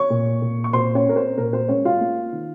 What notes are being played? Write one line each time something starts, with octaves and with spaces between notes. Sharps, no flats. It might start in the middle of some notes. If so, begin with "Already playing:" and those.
Already playing: C#5 C#6
A#2
A#2
C#6
A#2 C5 C6
C#4 C#5
C4 A#4
C5
A#2 A#4
C5
G#3 C#4 C#5
F4 F5
A#3
D#3